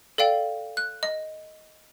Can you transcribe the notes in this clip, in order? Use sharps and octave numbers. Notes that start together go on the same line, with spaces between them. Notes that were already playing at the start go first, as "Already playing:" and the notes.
A4 D5 F5 G5
F#6
D#5